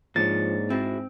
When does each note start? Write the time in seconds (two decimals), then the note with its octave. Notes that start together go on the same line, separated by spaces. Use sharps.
0.16 G#2 F3 A#3 D4 C#5 A6
0.70 C4 E4 F#4 G#4